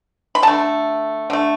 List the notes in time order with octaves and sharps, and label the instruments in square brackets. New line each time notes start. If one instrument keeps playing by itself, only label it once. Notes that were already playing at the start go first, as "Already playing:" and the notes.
[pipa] B5
D3 A3 A5
D3 A3